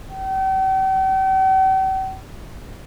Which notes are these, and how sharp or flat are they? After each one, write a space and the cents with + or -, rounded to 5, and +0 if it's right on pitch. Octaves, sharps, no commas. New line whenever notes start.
G5 -45